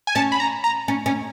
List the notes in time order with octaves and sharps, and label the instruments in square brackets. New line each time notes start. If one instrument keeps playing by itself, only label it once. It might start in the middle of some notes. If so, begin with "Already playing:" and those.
[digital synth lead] G#5
[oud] C#4 [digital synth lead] A5
[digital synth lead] B5
A#5
A#5
[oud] C#4
C#4